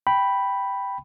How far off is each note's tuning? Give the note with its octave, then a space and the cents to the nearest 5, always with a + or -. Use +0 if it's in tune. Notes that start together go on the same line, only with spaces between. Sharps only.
G5 +0 B5 +0